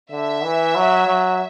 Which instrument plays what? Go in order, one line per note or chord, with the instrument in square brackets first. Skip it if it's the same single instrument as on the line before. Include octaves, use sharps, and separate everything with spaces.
[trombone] D3 [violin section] E5
[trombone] E3
F#3
F#3